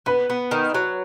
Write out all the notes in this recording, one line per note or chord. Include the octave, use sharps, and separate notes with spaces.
B3 B4
B3
D#3
F#3